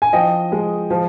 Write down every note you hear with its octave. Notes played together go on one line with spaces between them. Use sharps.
G#5
F3 D#5 G5
G#3
F3